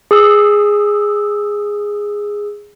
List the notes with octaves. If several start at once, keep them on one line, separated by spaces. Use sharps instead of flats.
G#4 D#6 E6